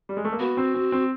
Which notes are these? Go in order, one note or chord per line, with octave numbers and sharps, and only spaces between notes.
G3
G#3
A3
A#3
B3 F#4
C4
C4
C4